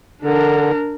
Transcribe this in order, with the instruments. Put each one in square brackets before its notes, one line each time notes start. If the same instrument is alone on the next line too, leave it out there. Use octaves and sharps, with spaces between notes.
[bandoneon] D3 [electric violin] D4 A#4